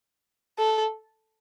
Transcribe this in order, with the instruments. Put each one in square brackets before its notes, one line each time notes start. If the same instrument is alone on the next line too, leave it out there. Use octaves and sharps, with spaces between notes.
[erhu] A4